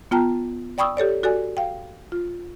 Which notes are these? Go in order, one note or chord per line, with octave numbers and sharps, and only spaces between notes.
B3 F4 G5 A5 A#5
D5 G5 B5 C#6 D#6 E6
G4 A4 C#5 D5
F#4 A4 D5 G#5
F5 G5
F4